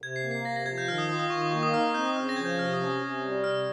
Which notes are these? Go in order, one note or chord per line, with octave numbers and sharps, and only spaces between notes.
C3 G#6
C7
A#3
C7
C3 A#6
A#6
F3 G#6
G6
D#3 F6
D#6
F4 D#6
D#6
D#3 C#6
D#6
A#3 C#6
D#6
D#4 F6
F6
C4 G6
D#6
C#3 F6
A#6
F3 G#6
G6
C3 F6
D#6
C#4
D#6
C3
G3
C3 F6